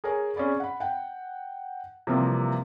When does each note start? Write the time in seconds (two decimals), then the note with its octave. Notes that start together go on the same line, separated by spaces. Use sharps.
0.04 G#4 A#4 C#5 G#5
0.36 C#4 G#4 D5 B5
0.60 F#5 B5
0.80 F#5 G5
2.07 C3 E3 F3 G3 A#3 C4